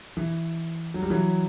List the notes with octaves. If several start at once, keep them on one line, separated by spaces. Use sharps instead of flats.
E3
F#3
G3
E3 F#3